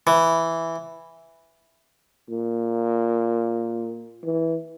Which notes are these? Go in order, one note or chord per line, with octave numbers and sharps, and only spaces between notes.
E3
A#2
E3